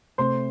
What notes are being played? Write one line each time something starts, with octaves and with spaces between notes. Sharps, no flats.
C3 A3 C4 C5 C6